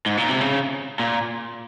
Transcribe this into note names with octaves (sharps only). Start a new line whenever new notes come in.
G#2
A#2
C3
C#3
A#2